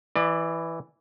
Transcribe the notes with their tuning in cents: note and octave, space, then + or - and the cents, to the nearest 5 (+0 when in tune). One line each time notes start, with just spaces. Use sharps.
E3 +0 D5 +30